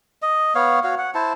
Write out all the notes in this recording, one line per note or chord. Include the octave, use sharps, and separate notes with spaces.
D#5
B3 C#5 F5
F#4 C#5 F5
F#5
E4 C5 A5